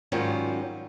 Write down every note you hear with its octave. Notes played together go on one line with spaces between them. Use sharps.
G#2 D#3 F#3 G3 C#4 F4